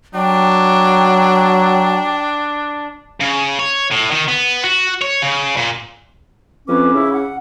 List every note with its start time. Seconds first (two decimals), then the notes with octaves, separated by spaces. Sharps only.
0.15 F#3 D4 G5
3.20 C#3
3.59 C#5
3.91 A2
4.11 D#3
4.28 B3
4.64 F#4
5.02 C#5
5.22 C#3
5.57 A#2
6.68 F2 C#4 B4 D6
6.94 C#3 E4
7.13 F#5